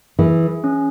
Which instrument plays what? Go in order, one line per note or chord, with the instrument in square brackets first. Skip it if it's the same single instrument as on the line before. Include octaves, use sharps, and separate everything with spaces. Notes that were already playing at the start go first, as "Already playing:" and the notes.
[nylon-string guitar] E3 [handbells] G#4
[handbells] C#4